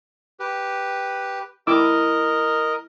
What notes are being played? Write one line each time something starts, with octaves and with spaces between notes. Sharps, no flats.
G4 B4
E4 A#4 D#5 D6 E6